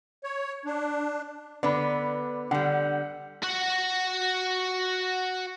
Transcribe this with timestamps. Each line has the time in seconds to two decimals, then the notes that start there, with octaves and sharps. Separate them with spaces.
0.24 C#5
0.66 D4
1.63 D3 B3 B4 D5 B5
2.51 D3 G3 F#5
3.43 F#4 F#5